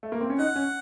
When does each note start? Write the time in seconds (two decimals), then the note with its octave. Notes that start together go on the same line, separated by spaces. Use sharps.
0.03 A3
0.12 A#3
0.20 C4
0.30 C#4
0.39 D#4 F#5
0.56 C#4